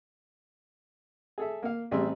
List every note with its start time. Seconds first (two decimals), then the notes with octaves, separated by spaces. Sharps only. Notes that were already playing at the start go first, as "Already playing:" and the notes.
1.38 G#4 A4 E5
1.63 A#3 F5
1.91 A1 G3 C4 G#4 E5 C6